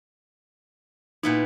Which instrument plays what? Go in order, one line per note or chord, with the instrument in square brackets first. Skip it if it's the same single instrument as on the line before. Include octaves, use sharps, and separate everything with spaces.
[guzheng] A#2 B3 E4 [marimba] D#4